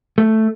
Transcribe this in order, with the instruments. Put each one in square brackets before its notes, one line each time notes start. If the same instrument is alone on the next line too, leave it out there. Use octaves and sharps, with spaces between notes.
[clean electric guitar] A3